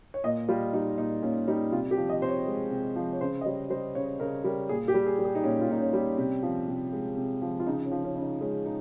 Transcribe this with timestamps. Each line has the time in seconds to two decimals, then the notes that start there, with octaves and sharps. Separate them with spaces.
0.14 C#5
0.24 A#2 D#5
0.48 G3 F4
0.73 G3 D#4
0.98 A#2 D#4
1.22 A#2 C#4
1.48 G3 D#4
1.72 C3 F4
1.91 G4
1.97 F3
2.09 D#5
2.22 C3 C5
2.28 C#5
2.47 G#3
2.71 C3
2.96 F3
3.13 C#5
3.21 C#3 C5
3.41 D#5
3.46 G3 C#5
3.70 G3 C5
3.95 C#3 C#5
4.20 C#3 A#4
4.44 G3 A#4
4.69 A#2 G#4
4.88 G4
4.94 G3
5.06 G#4
5.19 G3
5.25 G#4
5.35 D#4
5.44 A#2 C#4
5.61 F4
5.68 A#2 D#4
5.81 C#4
5.93 G3
6.18 C3
6.43 F3
6.68 C3
6.92 G#3
7.17 C3
7.42 F3
7.60 F4
7.66 C#3 D#4
7.85 C#4
7.92 F3
8.04 C#4
8.16 C#3
8.22 D#4
8.41 G#3 C#4
8.65 C#3 D#4